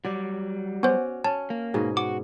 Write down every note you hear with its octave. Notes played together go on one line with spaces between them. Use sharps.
F#3 G3 D5
B3 C#4 F#4 C5 D5
C#4 A5
A#3
G#2 B2 G#4
F#4 D6